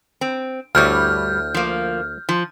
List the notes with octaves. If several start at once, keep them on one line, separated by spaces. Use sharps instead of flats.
C4
D2 G2 G3 E4 C#5 F6 G6
F3 A#3
F3